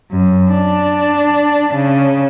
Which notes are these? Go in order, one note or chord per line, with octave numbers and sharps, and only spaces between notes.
F#2
D4
C#3